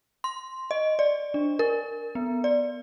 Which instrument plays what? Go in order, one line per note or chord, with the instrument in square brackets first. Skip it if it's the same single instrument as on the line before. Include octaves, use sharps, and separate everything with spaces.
[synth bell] C6
D#5
D5
D4
A#4
B3
D5